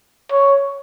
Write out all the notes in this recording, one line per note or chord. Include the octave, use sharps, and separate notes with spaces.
C#5